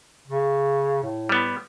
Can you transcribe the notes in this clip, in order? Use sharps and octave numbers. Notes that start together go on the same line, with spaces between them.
C#3
A2
G3 B3